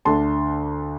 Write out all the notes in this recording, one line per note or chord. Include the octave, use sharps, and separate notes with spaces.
D2 D3 A3 D4 A5 C6